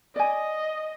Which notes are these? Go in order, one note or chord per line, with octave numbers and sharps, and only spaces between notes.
D5 D#5 G#5